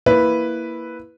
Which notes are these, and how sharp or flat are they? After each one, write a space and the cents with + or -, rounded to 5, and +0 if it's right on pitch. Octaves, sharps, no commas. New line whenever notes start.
A#3 +0 E4 +0 B4 +0